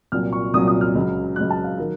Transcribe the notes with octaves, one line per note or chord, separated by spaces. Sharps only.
C2 A#2 F#3 F6
C#6
C2 A#2 F#3 D#6
D#6
F6
C#2 C#3 F#3
C#2 C#3 F#3 F#6
A5
F5
D#3 F#3 A#4